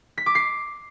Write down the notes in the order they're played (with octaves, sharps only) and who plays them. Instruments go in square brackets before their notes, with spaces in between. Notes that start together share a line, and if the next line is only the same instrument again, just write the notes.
[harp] B6
D6
C7